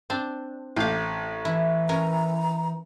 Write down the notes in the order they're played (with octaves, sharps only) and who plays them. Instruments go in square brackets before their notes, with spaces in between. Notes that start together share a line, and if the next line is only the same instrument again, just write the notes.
[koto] C4 D4
[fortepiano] A1 [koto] G4 F5
[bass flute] E3 [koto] E4
[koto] C#4 A#4 [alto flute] A#5